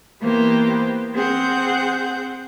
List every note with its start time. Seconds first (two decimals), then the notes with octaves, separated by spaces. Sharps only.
0.21 E3 A#3 B3 G4 C5
1.15 C4 G#4 F#5 G6